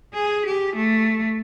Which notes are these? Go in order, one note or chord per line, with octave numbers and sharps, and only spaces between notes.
G#4
G4
A3